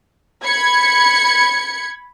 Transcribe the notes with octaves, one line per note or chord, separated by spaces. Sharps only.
B5 G#6 C#7